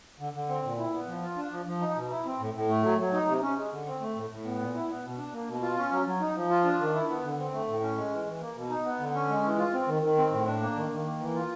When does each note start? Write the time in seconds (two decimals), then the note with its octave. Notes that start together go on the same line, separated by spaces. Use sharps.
0.19 D3
0.34 D3
0.49 C4
0.64 A#2
0.78 E4
0.93 B3
1.07 F3
1.22 F4
1.36 D4
1.51 F3
1.66 F3
1.81 D#4
1.95 B2
2.10 E4
2.25 C4
2.39 A2
2.54 A2
2.68 A3
2.83 F#3
2.98 F#3
3.13 D#4
3.27 C3
3.42 C#4
3.56 G#3
3.71 D3
3.86 C4
4.01 A3
4.15 A2
4.30 A2
4.44 B3
4.59 A#2
4.74 E4
4.88 B3
5.03 B2
5.18 D4
5.33 A#3
5.48 B2
5.62 F4
5.77 C#4
5.91 F#3
6.06 F#3
6.20 D#4
6.35 F3
6.50 F4
6.64 D4
6.80 D#3
6.94 E4
7.09 B3
7.23 D3
7.38 C4
7.52 A3
7.68 A2
7.82 C#4
7.97 G#3
8.11 E3
8.26 E3
8.41 A#3
8.55 B2
8.70 D#4
8.85 B3
8.99 D3
9.14 C#4
9.29 G#3
9.43 E3
9.59 F4
9.73 C4
9.87 D#3
10.03 D#3
10.17 C4
10.31 A2
10.46 D4
10.61 A#3
10.75 D#3
10.90 D#3
11.05 A#3
11.19 E3
11.34 F4